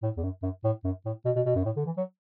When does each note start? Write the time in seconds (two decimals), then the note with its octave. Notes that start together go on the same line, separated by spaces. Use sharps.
0.03 A2
0.17 E2
0.23 F#2
0.43 F#2
0.64 A2
0.84 F#2
1.05 A2
1.25 B2
1.36 B2
1.46 B2
1.56 F#2
1.65 A2
1.77 D3
1.86 E3
1.97 F#3